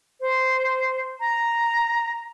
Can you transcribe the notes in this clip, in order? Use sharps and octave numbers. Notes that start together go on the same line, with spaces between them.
C5
A#5